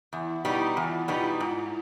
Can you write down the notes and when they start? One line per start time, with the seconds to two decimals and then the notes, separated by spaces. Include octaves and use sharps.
0.12 E2 E4
0.45 B2 G3 B3 D#4
0.77 E2 F4
1.08 B2 G3 B3 D#4
1.40 G#2